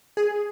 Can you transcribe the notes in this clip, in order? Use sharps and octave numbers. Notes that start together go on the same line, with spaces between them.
G#4